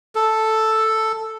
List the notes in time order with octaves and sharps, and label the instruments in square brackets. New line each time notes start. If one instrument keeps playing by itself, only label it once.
[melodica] A4